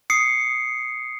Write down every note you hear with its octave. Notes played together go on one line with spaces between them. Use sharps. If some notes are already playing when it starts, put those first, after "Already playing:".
D#6 C7 C#7